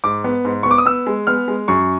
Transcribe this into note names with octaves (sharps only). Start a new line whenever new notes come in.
G#2 D6
B3
G#2
B3 C#6
D6
D#6
B3 E6
G#3
B3 F6
G#3
F#2 C#6